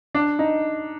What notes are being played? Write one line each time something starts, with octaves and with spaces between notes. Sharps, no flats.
D4
D#4